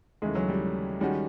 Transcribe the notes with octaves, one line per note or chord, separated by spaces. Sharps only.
D#2 C#3 E3 G#3 A3
F#3
G3
D#3 G3 G#3 C#4 F#4